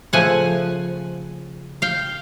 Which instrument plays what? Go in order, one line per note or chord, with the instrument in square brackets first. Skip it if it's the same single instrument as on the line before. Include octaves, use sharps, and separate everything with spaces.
[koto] C#3 F3 A3 F#5 G#5
F5 G5